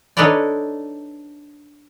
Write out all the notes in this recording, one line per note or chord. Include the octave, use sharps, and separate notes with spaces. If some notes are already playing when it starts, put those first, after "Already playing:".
D4 D#4 A4 B4 C#5 D5